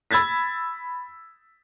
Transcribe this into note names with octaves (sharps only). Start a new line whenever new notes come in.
B5 E6 G#6 A6 B6